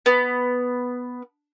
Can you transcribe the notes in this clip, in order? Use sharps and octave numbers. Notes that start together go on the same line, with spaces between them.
B3